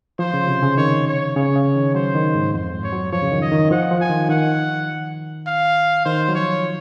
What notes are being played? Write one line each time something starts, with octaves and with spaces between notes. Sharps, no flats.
F3 C5
C#3
C3
C#3
D#3 C#5
C#5
C#3 C#5
C#3
D#3
F#3 C5
D#3
G#2
F2 C5
G#2
C#5
F#3
F3 C#5
C#3
D#3
D#5
D#3
F3 F#5
F3
G#5
D#3
D#3 F#5
F5
D#3 C5
F#3
F3 C#5